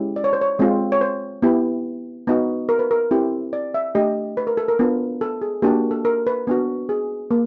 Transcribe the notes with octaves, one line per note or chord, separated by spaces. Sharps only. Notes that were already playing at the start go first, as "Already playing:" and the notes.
Already playing: G#3 C#4 E4 G4
D5
C#5
C5
C#5
G#3 C4 F4
C#5
C5
B3 E4 G4
B3 D#4 F#4
A#4
B4
A#4
C4 E4 G4
D5
E5
A3 D4 G4 D#5
B4
A#4
A4
A#4
B3 D4 F4
A4
G#4
A#3 D4 F#4 G4
A4
A#4
B4
B3 D4 F#4
G#4
A#3